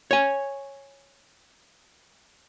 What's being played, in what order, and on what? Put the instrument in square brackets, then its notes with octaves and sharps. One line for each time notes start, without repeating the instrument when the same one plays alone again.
[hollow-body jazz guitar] C#5 G#5